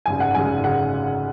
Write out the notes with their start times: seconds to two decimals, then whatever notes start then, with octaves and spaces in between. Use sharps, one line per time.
0.06 G#1 F#2 C#3 G#5
0.20 F#5
0.35 G#1 F#2 C#3 G#5
0.64 C#3 F#5